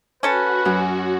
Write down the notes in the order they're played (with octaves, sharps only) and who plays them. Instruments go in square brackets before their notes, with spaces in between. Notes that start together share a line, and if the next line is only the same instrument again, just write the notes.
[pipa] C#4 A4 A5 [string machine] F#4 [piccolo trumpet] B4
[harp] F#2